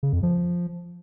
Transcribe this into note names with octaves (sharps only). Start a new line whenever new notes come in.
C#3
F2
F3